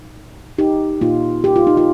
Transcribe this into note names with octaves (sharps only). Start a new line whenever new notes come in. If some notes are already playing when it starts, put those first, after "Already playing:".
Already playing: A#2 D#4
D#4 G4
A#2 A#3 D#4 F4
G4
F4
D#4
F4